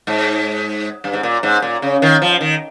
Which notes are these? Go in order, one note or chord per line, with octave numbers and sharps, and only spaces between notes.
G#2
G2
G#2
A#2
G#2
A#2
C#3
D#3
F3
D#3